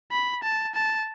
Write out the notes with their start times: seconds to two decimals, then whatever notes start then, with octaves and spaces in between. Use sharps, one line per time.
0.11 B5
0.43 A5
0.75 A5